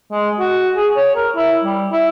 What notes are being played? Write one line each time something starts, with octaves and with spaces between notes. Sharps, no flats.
G#3
F#4
G#4
C#5
A#4
E4
G3
E4